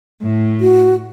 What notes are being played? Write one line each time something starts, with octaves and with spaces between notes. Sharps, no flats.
A2
F#4